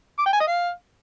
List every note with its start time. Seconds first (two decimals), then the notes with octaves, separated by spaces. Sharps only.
0.19 D6
0.26 G5
0.33 G#5
0.40 D#5
0.47 F5